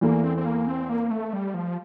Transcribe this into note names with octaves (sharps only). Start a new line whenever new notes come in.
E2 E3 A3 A#3
C4
C4
A#3
C4
A#3
A3
G3
F3